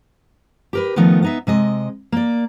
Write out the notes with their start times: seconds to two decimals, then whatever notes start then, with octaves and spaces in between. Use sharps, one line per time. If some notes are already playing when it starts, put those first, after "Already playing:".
0.73 G4 A#4 B4
0.96 D#3 F3 A3 B3 D#4
1.22 B3 D#4 E5
1.47 C3 G#3 D#5
2.12 A#3 D5